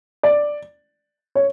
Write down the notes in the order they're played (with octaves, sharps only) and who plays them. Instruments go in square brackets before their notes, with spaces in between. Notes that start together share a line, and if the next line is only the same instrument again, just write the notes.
[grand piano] D5
C#5